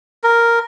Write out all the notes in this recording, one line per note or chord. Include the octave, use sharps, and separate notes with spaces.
A#4